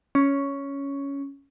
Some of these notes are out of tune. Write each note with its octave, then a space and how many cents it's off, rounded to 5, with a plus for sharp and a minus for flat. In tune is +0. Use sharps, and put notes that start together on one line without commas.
C#4 +5